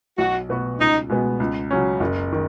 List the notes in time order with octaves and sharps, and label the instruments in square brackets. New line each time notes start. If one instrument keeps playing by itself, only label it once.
[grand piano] B1 [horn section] F#4
[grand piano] B2 B3 F#4 B4
[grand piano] C#2 [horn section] D#4
[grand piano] B2 G#3 B3
C#2
C#3 F#3 C#4
F#1
D#3